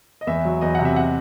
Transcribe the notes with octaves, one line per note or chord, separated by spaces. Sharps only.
D#5
E2 E5
F#3
E2 D#5
C3 F#5
E5
F#5